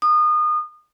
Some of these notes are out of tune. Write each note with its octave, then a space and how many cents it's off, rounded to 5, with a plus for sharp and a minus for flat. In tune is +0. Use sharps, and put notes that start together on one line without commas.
D#6 -30